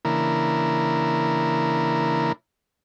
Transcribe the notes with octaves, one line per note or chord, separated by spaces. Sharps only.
C#3 E3 A#3 D4 E4 A#4